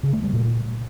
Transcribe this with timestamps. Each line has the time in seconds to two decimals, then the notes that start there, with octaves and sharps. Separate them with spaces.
0.03 C#3
0.13 A3
0.23 G3
0.33 A#2